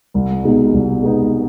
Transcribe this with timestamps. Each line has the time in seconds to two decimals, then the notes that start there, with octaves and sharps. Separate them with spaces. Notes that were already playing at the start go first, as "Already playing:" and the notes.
0.14 C2
0.44 B2 G#3 B3 D#4
0.73 C2
1.01 B2 G#3 B3 D#4